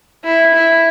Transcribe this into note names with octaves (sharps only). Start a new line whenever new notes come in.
E4
E4